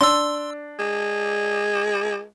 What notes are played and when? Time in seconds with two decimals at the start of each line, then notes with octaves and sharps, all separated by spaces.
0.01 D4 C6 E6
0.79 G#3